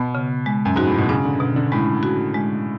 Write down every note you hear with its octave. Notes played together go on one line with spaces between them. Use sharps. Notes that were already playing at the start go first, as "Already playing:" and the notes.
Already playing: B2 B3
C#3
G#3
F#2
G#2 F#4
A2
B2
C#3 D4
D3
B2
D3
A2 G#3
F#4
G#3